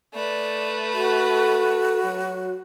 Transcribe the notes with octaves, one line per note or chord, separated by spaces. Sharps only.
A3 B4 D5
F#4 A4
F#3